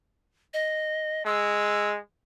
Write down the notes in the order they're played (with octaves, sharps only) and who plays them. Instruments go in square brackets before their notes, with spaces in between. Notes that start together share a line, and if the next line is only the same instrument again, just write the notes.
[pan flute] D#5
[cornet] G#3 [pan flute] E6